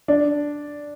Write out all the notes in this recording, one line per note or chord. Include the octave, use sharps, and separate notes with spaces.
D4